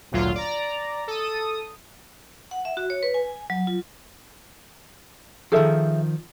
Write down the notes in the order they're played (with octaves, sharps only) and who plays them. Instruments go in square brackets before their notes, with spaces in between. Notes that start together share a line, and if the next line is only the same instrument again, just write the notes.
[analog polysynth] G#1 D2 A#2 F#3 F4
D5 A#5
A4 D#6
[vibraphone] F#5
E5
F#4
C#5
B4
G#5
F#3
F4
[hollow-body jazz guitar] D#3 F3 [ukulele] G#4 A4 E5